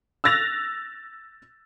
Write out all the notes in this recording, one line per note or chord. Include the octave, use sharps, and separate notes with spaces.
E6 F#6 A6 A#6 F7